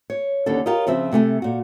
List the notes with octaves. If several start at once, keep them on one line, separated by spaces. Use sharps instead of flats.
C#5
D#2 D3 C#4 A4
F4 G4 A#4 C#5 D#5
C#3 F3 C4 E5
C3 A3 G#5
A#2 F#4